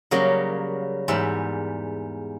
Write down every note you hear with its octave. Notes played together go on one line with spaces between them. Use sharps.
C#3 F#3 G3 A#3
E2 G#2 G3 E5 B5